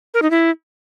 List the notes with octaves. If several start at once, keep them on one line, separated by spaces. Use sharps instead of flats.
A#4
D#4
E4